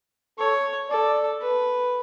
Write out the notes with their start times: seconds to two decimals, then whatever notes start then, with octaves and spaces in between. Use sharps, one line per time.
0.39 A4 C#5
0.90 A4 D5
1.41 B4